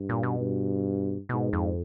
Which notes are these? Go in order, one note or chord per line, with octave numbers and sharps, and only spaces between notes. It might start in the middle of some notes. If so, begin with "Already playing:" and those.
Already playing: G2
A#2
B2
G2
G#2 B2
F2